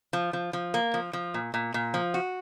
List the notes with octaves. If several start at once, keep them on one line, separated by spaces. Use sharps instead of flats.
F3
F3
F3
A#3
F3
F3
A#2
A#2
A#2
F3
F#4